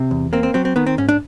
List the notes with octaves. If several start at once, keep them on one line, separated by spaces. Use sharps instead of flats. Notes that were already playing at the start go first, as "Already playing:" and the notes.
Already playing: C3
E2
A#3 C4
C4
F#3 C4
C4
D#3 B3
C4
G#2 C#4
D4